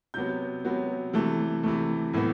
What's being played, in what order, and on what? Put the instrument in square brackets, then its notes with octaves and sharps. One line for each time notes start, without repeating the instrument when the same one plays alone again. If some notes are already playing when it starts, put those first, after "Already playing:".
[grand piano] C3 F#3 B3 G6
C3 F#3 B3
C3 E3 A3
C3 E3 A3
A2 E3 B3